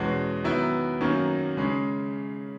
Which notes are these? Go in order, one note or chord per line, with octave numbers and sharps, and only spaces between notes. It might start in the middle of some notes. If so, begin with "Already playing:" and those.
Already playing: E2 B2 G#3 C#4 F#4
D#3 F#3 B3 E4
F#2 D#3 F#3 A#3 C#4
C#3 G#3 C#4